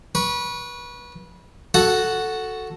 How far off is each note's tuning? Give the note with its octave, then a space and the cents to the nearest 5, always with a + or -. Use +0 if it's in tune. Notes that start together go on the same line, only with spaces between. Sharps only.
B4 -25 C#6 +0
F#4 +0 A4 +0 F#5 +0